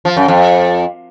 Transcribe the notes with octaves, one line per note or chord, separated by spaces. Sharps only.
F3
F#2
F2